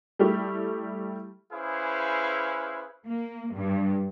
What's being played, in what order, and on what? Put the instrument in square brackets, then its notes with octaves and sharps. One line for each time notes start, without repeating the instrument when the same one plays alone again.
[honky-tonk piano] G3 A3 E4 G4
[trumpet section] C#4 E4 G#4 B4 C5 F5
[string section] A#3
G2